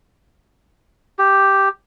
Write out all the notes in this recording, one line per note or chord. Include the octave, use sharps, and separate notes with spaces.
G4